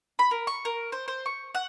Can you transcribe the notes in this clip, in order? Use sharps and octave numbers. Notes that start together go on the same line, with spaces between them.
B5
A#4
C#6
A#4
C5
C5
C#6
F#5